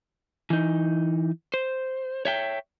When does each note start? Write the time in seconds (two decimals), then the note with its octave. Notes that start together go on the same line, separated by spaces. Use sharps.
0.50 E3 D#4
1.54 C5
2.25 C#5 E5 G5